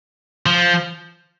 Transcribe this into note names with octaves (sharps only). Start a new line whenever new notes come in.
F3